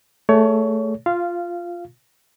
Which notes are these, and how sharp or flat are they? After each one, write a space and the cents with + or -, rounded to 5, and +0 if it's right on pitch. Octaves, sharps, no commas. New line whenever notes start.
A3 +0 G#4 +0 C#5 +25
F4 +0 F5 -15